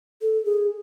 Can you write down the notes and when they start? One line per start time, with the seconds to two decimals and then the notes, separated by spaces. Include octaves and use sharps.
0.22 A4
0.45 G#4